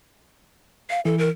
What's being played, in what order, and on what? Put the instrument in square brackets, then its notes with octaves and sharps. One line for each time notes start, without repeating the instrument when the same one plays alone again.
[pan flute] F5
[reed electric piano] E3 [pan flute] A4
[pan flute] A#4